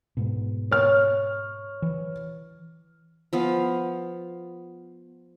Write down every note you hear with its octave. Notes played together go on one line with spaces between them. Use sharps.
G#2 B2
C#5 F6
E3
F3 B3 F5